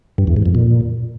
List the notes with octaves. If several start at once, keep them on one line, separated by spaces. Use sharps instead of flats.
G2
E2
G#2
F2
A#2